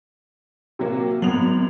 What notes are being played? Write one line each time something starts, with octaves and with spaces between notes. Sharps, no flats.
C3 F#3 A#3
G#1 F#3 B3 F7 F#7